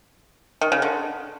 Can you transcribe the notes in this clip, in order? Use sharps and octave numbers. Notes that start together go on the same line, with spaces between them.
D#3
C#3
D3